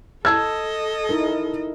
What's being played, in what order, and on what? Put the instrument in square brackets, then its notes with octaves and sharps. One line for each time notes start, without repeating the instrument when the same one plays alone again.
[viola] A4 D#5 [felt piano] A5 E6 G#6
[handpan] D#4 E4 A#4